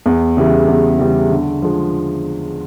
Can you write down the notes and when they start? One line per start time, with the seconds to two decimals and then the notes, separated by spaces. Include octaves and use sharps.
0.06 E2
0.37 C#3 E3 G3
0.68 E2
0.99 C#3 E3 G3
1.30 D3
1.62 F3 G#3